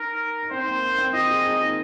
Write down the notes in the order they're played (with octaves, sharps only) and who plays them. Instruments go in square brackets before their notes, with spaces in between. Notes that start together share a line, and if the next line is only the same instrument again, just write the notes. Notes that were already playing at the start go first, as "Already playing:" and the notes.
Already playing: [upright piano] D#4 [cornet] A#4
[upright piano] D#4
[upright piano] C4 [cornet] C5
[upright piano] A#3
A#3
C4
[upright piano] F4 [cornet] D#5
[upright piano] G#4
D#4
A#3